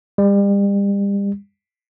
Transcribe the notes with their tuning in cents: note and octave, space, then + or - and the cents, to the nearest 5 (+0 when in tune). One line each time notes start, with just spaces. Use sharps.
G3 +35